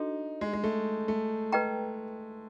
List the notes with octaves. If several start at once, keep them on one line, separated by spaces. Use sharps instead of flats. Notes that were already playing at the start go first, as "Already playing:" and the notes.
Already playing: D4 D#4 F#4 A4
G#3
G#3
A3
A3
B4 D#5 G5 A#5